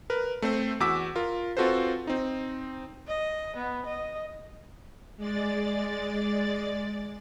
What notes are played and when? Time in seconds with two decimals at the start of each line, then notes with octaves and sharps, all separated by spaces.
0.10 A#4 B4
0.42 A3 C4 C5
0.80 E2 F#4 D6 E6 B6
1.16 F4 A#4
1.57 C4 F4 F#4 A4 B4 C5
2.07 C4 D#4
3.08 D#5
3.57 B3
3.87 D#5
5.17 G#3 D5 A6